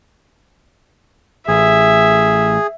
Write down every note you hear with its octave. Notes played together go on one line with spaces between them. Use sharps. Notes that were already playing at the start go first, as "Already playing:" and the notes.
A1 G#4 E5